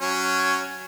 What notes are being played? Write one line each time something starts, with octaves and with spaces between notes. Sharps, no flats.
F#3 C#4 C#5